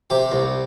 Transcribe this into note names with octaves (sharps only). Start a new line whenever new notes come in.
C3 G4
C2